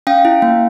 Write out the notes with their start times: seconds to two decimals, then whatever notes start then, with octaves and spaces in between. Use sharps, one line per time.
0.07 C#4 F5 G5
0.25 E4
0.42 A#3